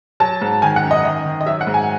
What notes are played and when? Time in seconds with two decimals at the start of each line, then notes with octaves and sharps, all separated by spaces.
0.20 F#3 A5
0.42 G#2
0.62 D#3 G#5
0.76 F#5
0.83 F#2
0.91 D#5
1.05 D#3 D#5
1.26 D#3
1.41 D#5
1.46 F#3 E5
1.61 F#5
1.67 G#2
1.74 G#5